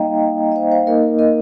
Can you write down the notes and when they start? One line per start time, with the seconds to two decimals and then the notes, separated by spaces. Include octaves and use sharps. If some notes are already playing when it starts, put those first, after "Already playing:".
Already playing: G3 A#3 D#4 D#5 F5 G5 A#5
0.52 D#5
0.56 C5 F5
0.71 C5 F5
0.87 A#3 D#4 A#4 D#5
1.19 A#4 D#5